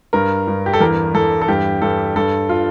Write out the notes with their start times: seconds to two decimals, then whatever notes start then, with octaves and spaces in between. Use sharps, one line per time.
0.13 G2 A#4
0.48 G2
0.66 G4
0.73 A4
0.81 E2 A#4
1.15 E2 A4
1.42 A4
1.48 G2 G4
1.82 G2 A4
2.16 G2 A4
2.49 F4